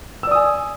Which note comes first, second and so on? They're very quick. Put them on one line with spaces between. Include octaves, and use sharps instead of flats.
E6 D5 D#6 G#5